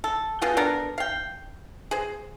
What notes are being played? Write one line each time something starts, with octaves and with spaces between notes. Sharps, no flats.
A4
B2 F4 G#4 G5
B3 D4 A4 A#4
F5 G5
G#4 C5